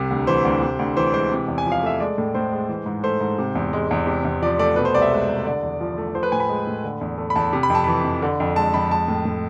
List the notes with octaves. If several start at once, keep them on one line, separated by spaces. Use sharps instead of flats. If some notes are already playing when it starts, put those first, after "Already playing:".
Already playing: C2 C3
D2
E3 C5
D2
C3
D2
E3 C5
G#3 C5
C3
E2
G#5
F3
F5
A3 E5
G#3 D5
A2
A2 C5
G#3
E3
G#2
A3 C5
G#2
C3
E2
G#3
E2
C3
E2
F3 D5
A3 D5
B2 B4
C5
C2 D5
E5
G#3
C2
D3 D5
E2
F3
A3
F3 C5
B4
A2 G#5
B5
G#3
A2
D3
E2
A3
B5
E2 A5
C3
B5
F2
A5
E3 B5
F2
D3
F2
G#3 A5
F2 B5
G#3 A5
A2
A2